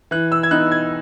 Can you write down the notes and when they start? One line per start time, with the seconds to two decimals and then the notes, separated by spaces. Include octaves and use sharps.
0.11 E3 F#6
0.32 E6
0.43 G#6
0.51 B3 D#4 F#6
0.71 G#6